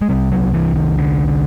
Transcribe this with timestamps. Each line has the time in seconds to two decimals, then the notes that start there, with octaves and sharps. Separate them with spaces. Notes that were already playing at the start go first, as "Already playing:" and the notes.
0.02 G#3
0.09 C2 C3 G3
0.31 F#3
0.54 E3
0.75 D#3
0.98 D3
1.28 D3